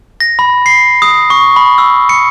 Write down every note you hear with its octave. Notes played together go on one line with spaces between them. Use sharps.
A#6
B5
C7
D#6
C#6
B5
E6
C#7